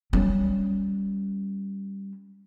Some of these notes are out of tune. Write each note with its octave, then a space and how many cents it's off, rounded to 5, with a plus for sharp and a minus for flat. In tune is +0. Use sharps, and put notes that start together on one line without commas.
G3 +0 C#4 +0